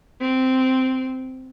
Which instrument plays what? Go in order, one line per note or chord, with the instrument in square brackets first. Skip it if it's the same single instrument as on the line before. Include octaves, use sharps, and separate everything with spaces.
[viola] C4